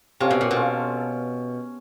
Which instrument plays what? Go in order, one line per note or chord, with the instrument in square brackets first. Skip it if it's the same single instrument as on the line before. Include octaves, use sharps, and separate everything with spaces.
[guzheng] C3 [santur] C#4 F4 A4
[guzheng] B2
A#2
B2
[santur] C#4 F4 A4